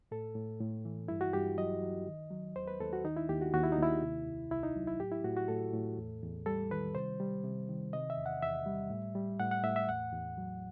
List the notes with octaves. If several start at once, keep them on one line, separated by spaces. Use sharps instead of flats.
A2 A4
A2
A2
E3
G2 E4
F#4
G2 G4
F#3 D#5
F#3
D#3
F#3
D#2 C5
B4
D#2 A4
F#4
D#3 D#4
E4
D#2 G4
F#4
D#2 F#4
E4
D#4
D#2 E4
C3
C2
C2 E4
D#4
F#3
E4
A2 G4
E4
A2 F#4
F#4
A2 A4
A2
E2
E2
G3 A4
D#3 B4
C3 C5
G3
C3
D#3
C3 D#5
E5
E2
F#5
E2 E5
G3
A2
G3
A2 F#5
F#5
A2 E5
E5
E2 F#5
E2
F#3